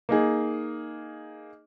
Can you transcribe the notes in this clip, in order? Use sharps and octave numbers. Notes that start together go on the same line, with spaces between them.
A#3 D#4 G#4